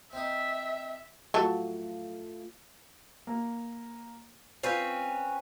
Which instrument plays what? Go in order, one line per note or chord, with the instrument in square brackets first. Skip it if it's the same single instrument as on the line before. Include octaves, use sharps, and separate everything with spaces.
[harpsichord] C4 D#4 [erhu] E5
[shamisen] F#3 A4 [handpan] A3 F4
[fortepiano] A#3
[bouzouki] C4 C#4 B4 [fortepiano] F4 D5 F5